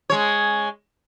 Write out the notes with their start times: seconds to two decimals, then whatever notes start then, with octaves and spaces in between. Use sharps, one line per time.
0.10 G#3 C#5